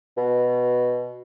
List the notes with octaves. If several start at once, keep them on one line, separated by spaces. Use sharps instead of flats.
B2